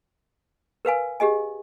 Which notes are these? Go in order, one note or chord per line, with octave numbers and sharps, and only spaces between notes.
A#4 B4 F5 G#5
G4 G#4 D#5 G#5